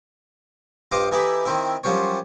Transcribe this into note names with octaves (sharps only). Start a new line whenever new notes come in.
G2 F4 C5 D#5 D6
E3 D#4 E4 G4 A4 B5
D#3 C4 E4
F#2 F3 G3 C5 C#5